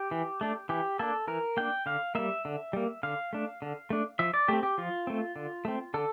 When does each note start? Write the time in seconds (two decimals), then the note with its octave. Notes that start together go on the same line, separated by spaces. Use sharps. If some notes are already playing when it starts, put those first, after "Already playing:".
Already playing: G4
0.11 E3
0.41 A3 D4
0.69 E3 G4
0.99 A#3 D4 A4
1.28 E3 A#4
1.57 A#3 D4 G5
1.86 D3 F5
2.15 G3 A#3 E5
2.45 D3
2.73 G3 A#3
3.03 D3 F5
3.33 A3 D4
3.62 D3
3.90 A3 D4
4.19 F3 E5
4.34 D5
4.48 A3 C4 G4
4.63 G4
4.78 F3 F4
5.07 A3 C4
5.36 D3
5.65 A3 C4
5.94 D3 A4